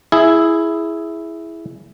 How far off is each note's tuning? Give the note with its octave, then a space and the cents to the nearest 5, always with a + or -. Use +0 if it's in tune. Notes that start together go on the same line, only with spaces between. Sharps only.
E4 +0 G#4 +5